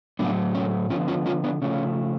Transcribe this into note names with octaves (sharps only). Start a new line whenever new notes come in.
A2 F#3 A3 B3 D4
C#4
D3 F3 B3 C#4 F4
C#4 F4
C#4 F4
B3 D4
C#3 F3 A3 C#4